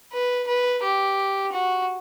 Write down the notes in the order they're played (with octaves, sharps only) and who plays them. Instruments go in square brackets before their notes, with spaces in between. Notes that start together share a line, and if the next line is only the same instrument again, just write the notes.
[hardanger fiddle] B4
B4
G4
F#4